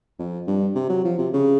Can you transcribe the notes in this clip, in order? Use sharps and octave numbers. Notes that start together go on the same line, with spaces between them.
F2
G2
C3
F#3
F3
C3
C#3